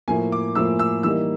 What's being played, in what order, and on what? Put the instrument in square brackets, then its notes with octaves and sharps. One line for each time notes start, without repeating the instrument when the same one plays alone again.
[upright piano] A2 F3 A#3 G#5
D6
A2 F3 A#3 E6
E6
E3 G3 A#3 D#4 E6